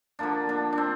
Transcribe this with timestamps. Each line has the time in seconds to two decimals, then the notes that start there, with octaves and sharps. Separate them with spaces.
0.19 D3 F3 A#3 D4
0.49 D4
0.73 D4
0.78 C4